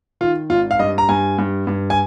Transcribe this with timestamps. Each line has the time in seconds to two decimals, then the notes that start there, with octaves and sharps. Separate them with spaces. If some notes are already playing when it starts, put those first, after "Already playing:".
0.21 D#3 F4
0.50 G#1 F4
0.71 F5
0.79 G2 D#5
0.98 A#5
1.09 G2 G#5
1.38 G2
1.67 G2
1.90 G#5